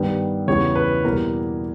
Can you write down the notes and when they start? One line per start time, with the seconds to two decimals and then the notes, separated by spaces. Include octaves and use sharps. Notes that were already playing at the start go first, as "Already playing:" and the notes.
Already playing: G2 D#3 G3 B3
0.47 E2 C#3 G3 B3 C#5
0.75 B4
1.04 E2 B2 G3 A#3 A#4